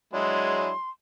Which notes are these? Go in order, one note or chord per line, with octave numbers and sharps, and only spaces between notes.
F#3 G#3 D4 E4 G#4 C6